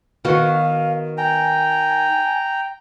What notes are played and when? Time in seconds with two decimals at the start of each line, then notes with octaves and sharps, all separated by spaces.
0.25 D#3 B3 F#4 F5
1.18 G5 G#5 A#5